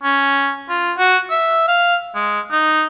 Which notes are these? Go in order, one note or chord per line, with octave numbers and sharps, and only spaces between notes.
C#4
F4
F#4
E5
F5
G#3
D#4